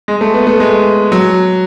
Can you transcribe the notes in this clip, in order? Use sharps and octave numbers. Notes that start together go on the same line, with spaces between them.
G#3
A3
B3
A3
G#3
F#3